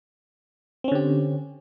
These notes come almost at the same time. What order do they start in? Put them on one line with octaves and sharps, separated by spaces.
C4 C#4 D3 G4